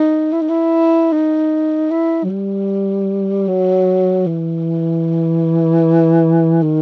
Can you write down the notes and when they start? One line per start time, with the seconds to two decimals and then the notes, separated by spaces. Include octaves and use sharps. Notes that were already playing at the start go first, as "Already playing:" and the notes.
Already playing: D#4
0.32 E4
0.41 D#4
0.49 E4
1.12 D#4
1.91 E4
2.24 F#3
2.29 G3
3.48 F#3
4.26 E3
6.62 D#3